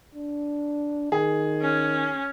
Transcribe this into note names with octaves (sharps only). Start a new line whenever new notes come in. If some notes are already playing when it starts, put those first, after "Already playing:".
D4
D#3 G#4
C#4